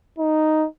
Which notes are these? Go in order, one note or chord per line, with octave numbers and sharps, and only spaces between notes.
D#4